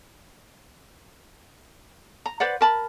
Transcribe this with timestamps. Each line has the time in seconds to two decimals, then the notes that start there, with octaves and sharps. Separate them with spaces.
2.26 A#5
2.40 B4 C5 D5 F#5
2.61 A#4 A5 B5